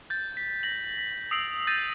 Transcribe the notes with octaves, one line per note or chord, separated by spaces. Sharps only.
G6 A6
B6
A#6 F#7
B6
D#6 E6 C7 D7 F7 F#7
E6 G6 A6 A#6 D#7 F#7